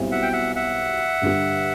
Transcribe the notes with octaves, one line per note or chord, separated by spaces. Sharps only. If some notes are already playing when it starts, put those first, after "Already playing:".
Already playing: B1 B2 G3 C4 E4
E5 F#5
G5
E5 F#5
E5 F#5
G2 D3 G3